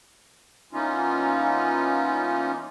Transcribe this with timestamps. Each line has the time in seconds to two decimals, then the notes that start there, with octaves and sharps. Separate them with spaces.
0.73 E3 A#3 B3 C#4 D#4 F4